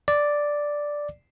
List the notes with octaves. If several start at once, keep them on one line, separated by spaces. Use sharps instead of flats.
D5